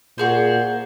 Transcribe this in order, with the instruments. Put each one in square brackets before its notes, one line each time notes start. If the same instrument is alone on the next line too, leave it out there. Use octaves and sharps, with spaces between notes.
[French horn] A#2 [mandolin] F#4 G#4 C5